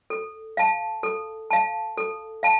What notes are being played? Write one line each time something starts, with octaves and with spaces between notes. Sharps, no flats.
A4
F5 A5
A4
F5 A5
A4
F5 A5